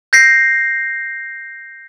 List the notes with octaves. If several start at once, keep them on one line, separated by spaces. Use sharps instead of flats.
G6 A#6 C7